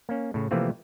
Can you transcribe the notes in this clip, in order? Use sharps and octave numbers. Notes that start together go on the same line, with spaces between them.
A#3 C#4
A2 C#3
C3 E3 F3 A3 A#3 C4